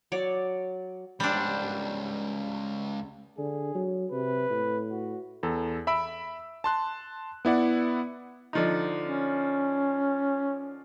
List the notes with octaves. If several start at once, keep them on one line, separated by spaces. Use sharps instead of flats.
F#3 C#5 D5
C#2 G3 D4 C5
D3 G#4
F#3
C3 B4
A2
F#4
E2 A4
E5 B5 E6 D7
A5 C6 F#6
B3 E4 D5 F#5
D3 F3 D#4
C#4